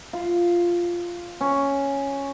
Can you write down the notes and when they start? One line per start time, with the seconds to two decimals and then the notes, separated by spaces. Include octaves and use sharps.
0.13 F4
1.41 C#4